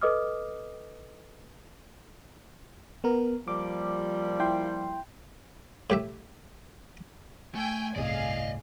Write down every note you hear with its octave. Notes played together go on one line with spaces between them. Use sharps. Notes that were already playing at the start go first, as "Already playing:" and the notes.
A4 B4 D#5 D6 D#6 F6
B3 A#4
F3 G3 A#3 D6
E4 G5 C6
A2 G4 E5
A3 G5 G#5
G1 C2 A2 G#4 D5 D#5 F5